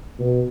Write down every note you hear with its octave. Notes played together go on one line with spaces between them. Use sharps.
B2